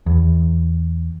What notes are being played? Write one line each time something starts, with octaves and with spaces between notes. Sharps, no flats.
E2